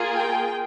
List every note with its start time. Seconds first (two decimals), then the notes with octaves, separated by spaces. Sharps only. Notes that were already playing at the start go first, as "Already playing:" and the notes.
Already playing: A#3 F4 G#4
0.13 G5